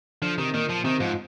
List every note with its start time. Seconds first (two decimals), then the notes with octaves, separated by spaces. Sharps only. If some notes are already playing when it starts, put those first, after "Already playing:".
0.22 D3 F3
0.38 C3 D#3
0.54 A#2 D#3
0.69 F3
0.84 C3 D#3
1.00 G#2 F3